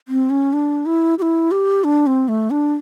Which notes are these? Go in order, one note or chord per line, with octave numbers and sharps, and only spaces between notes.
C4
C#4
D4
E4
G4
E4
G4
D4
C4
A3
D4